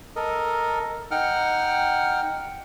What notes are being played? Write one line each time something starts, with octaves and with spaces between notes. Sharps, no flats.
A4 A#4 D#5
D#4 F#5 G5 F6